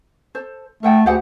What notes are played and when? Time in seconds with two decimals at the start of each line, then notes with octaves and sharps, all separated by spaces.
0.35 A4 C5
0.83 A3 A4 F#5 G5
1.06 D2 G4 G#4 F#5